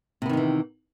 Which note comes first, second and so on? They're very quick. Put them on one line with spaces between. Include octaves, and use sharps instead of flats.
C3 B3 D#3 D#4 E3